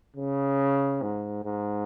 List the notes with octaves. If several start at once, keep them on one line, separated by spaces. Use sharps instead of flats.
C#3
G#2
G#2